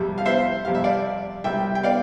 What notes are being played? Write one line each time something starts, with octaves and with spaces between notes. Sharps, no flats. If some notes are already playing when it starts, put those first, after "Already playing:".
Already playing: F2 C3 G3
F5
C5 E5
F2 C3 G3 F5
E5
D5 F5
C2 C3 G3 E5 G5
G5
D5 F5